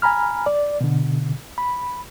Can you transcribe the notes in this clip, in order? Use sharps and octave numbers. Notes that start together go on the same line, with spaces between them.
G#5 A#5 B5 F6
D5
B2 D3
B5